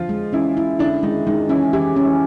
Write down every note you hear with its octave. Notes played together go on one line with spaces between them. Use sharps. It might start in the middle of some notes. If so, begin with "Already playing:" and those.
Already playing: D3 F3 F4
G#3
E3 C#4 E4
E4
D3 D4 E4
D#3 G#3 D#4
D#3 G#3 D#4
E3 C#4 E4
E3 E4 G4
C#4
E3 E4